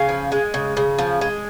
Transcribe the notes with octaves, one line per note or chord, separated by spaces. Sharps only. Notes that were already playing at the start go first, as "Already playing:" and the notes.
Already playing: C#3 F5 G#5
F3
G#3
C#3
C#3
F3
G#3